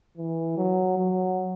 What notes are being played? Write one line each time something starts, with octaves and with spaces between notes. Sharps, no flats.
E3
F#3
F#3